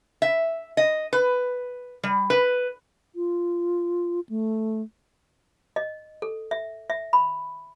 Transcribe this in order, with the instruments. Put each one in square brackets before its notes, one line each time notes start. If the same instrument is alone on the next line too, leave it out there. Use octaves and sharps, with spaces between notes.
[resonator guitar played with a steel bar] E5
D#5
B4
G3
B4
[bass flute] F4
A3
[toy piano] D#5
A4
E5
E5
B5